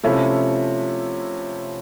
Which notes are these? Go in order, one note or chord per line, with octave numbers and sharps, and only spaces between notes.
C3 F3 A3 C#4 E4